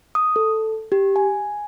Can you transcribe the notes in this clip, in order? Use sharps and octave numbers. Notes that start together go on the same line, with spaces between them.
D#6
A4
G4
G#5